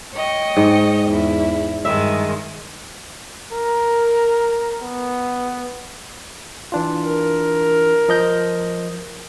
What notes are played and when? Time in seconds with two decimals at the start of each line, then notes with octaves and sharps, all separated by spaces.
0.13 C#5 D#5 G5
0.57 G#2
1.05 E2 E4
1.85 G2 D#3 G#3 E5
3.53 A#4
4.82 B3
6.72 E3 D4 F4
7.05 A#4
8.09 F3 D#5 G6